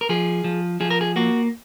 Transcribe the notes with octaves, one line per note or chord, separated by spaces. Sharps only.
A#4
F3 G#4
F3
F3 G#4
A#4
G#4
A#3 F#4